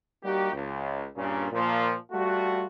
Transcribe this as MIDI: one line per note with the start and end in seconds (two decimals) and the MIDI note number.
0.23 0.52 55
0.23 0.52 58
0.23 0.52 63
0.23 0.52 66
0.23 0.52 67
0.53 1.07 37
1.16 1.47 43
1.16 1.47 46
1.16 1.47 49
1.52 1.94 46
1.52 1.94 53
2.12 2.66 55
2.12 2.66 57
2.12 2.66 65
2.12 2.66 66